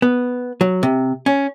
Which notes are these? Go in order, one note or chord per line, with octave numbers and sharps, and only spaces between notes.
B3
F#3
C3
C#4